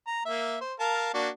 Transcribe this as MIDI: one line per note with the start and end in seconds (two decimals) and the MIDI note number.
0.07 0.24 82
0.26 0.57 58
0.26 0.57 76
0.61 0.73 72
0.80 1.11 70
0.80 1.11 77
0.80 1.11 81
1.14 1.29 58
1.14 1.29 62
1.14 1.29 66